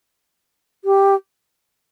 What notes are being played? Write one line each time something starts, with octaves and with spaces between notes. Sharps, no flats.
G4